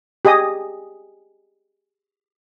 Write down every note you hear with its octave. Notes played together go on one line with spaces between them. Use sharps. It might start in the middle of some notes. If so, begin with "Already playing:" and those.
G4 G#4 D#5 D#6